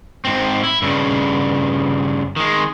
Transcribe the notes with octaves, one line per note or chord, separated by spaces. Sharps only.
G#2 C4
E4
G2 C#3
D#3 G#3